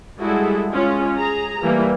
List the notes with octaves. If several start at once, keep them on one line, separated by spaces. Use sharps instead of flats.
G3 G#3 E4 F#4 G#4 A4
G#3 C#4 F4
G#4 A#5
E3 G3 A3 A#3 E4